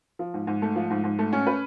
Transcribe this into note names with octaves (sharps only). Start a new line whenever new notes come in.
F3
G#2
G#2
A3
F3
G#2
G#2
A3
C#4
B4